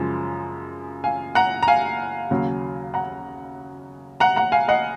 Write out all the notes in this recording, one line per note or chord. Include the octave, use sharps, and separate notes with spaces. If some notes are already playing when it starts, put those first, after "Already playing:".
Already playing: F#2 C#3 F3 G#3
F5 G#5
F#5 A#5
A#5
F5 G#5
D#2 C#3 F#3
F#5 A#5
F#5 A#5
F#5 A#5
F5 G#5
D#5 F#5